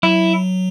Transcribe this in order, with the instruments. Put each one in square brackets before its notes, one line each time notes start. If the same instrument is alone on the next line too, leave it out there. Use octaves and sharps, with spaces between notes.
[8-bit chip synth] F#3 [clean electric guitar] E4